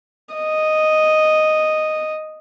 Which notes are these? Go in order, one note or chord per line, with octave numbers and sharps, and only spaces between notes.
D#5